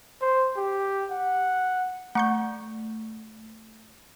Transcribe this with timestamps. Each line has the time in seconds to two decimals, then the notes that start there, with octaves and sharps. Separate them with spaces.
0.21 C5
0.57 G4
1.11 F#5
2.15 A3 F#5 C#6 G6